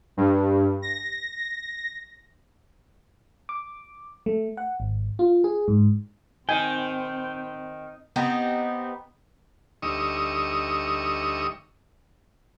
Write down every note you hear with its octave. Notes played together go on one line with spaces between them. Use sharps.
G2
A#6
D6
A3
F#5
G#1
F4
G#4
G#2
D#3 C4 G5 G#5
B3 C4 D#4 G4
D2 G3 D#4 C#6 D#6 E6